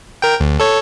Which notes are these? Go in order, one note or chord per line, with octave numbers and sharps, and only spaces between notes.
A#4 G5
D2
A4 C#5